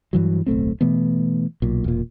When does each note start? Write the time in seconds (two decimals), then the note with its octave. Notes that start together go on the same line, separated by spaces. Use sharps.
0.13 G2 E3 F#3
0.46 D1 B1 A3 C4
0.81 B2 E3 A3 B3
1.62 B1 A#2
1.84 E1 A#2